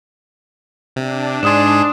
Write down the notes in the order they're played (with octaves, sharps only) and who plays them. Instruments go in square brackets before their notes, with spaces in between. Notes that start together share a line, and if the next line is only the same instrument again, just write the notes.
[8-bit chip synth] C3 [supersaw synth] D4
[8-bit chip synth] G#2 G#4 [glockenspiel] C6 D#6 E7